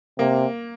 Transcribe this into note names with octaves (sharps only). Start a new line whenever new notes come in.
C3 A#3